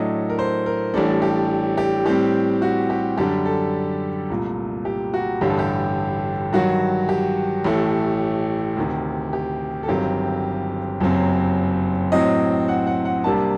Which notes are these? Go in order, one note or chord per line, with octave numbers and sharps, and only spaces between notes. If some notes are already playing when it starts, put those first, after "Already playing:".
Already playing: A2 F#3 A3 D4 D#5
A#4
C5
A#4
A1 A2 G3 D4 A4
G4
G4
A2 G3 C4 G4
F#4
G4
F#2 D3 G3 D4 G4
A4
C2 A#2 A3
G4
F#4
A1 G2 D3 G3 G4
A4
G4
G2 D#3 F#3 F#4
G4
A1 A2 A3
D2 C3 D#3
G4
A4
G1 G2 D#3 F#3 C4 G4
F#1 F#2 F#3 C4
A2 F#3 C4 D#5
F#5
F#5
F#5
C2 C3 G3 A#3 D4 A5